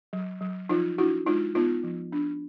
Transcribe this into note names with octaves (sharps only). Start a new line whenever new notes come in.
F#3
F#3
F3 D#4 F4
D4 E4 F#4
G#3 D#4 F4
B3 D#4 F4
F3
D4